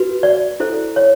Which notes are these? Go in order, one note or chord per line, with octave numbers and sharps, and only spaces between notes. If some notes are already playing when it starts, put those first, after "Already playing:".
Already playing: F#4 B4
D5
E4 A4 C5
C#5